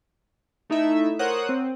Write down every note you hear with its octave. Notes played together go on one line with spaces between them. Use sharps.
A3 D#4 E4 E5
A#4 C5 C#5 F#5 D#6 F#6
C4